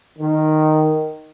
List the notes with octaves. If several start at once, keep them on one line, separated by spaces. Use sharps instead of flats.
D#3